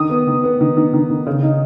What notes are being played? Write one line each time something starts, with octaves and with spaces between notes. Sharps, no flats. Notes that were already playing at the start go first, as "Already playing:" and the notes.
Already playing: D#3 D#6
B3
D#3
B3
D#3
D#3
D#3
D#3
C#3
D#4